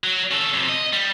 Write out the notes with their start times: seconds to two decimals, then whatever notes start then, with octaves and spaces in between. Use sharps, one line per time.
0.04 F#3
0.31 C#4 A4
0.53 F2 C3
0.69 D#5
0.93 G3